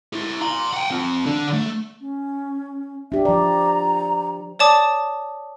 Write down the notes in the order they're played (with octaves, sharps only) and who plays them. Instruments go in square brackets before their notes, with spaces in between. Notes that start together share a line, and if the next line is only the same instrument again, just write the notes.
[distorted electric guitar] E4 G4
A#5 C6
F#5 G5
C4 F4
D3
A3
[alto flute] C#4
[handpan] D4 G4 [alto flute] E5
[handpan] F3 D5 [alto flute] A#5
[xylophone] C#5 D5 A5 D6 D#6